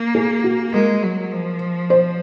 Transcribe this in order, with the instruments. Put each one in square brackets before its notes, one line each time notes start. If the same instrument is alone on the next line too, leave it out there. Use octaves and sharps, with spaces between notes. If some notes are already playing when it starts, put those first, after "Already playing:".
Already playing: [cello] A#3
[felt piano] G#4
F#4
[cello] G#3 [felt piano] A#4
[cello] F#3
F3
[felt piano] C5